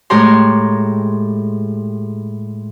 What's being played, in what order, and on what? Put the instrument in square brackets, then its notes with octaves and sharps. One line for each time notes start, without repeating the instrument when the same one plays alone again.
[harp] A2 G#3 G4 C#5 A#5 C6